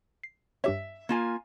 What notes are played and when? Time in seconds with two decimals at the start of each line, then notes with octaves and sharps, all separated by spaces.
0.24 C7
0.64 G2 G4 C#5 E5
1.09 A#3 F4 G#5